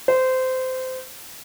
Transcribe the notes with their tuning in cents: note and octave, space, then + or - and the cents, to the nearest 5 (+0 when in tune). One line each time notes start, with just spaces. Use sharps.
C5 -20